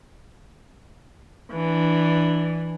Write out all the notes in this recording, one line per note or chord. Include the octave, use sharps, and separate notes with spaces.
E3 D4